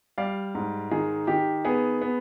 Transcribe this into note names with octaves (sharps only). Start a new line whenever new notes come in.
G3 D5 F5
G#2
D#3 G#4
D#3 G4
B3 G#4
B3